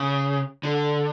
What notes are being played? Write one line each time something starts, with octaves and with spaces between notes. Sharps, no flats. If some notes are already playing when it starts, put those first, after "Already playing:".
Already playing: C#3
D3